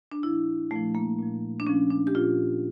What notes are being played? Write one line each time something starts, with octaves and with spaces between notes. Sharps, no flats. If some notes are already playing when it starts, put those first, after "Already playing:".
D4
A#2 F3 E4
A#2 F3 A3
A#3
A#2 F3
D4
A#2 F3 C#4
D4
G4
A#2 F3 F4